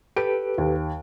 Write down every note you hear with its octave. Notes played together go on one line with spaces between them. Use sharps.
G4 A4 B4 D7
D#2